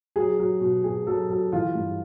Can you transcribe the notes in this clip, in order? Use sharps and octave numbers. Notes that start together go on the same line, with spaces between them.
F#3 G#4
F#3
B2
B2 G#4
F#3 A4
F#3 A4
E3 F4
G2